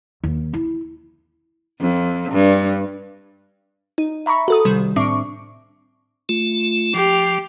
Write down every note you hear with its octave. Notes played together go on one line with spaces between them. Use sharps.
D#2
E4
F2
G2
D#4
E5 A#5 B5 C#6
F#4 A4 D#6
C2 C3 D#3 G3
A2 C4 D4 E5 C#6 D6
A3 F4
F3 G4